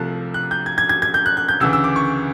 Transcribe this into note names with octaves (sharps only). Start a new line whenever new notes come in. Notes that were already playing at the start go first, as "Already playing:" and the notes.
Already playing: C2 C3 F3 A3 F#6
F#6
G6
G#6
G#6
G#6
G#6
G6
F#6
F#6
G6
D2 C#3 E3 E6
E6
D6
C#6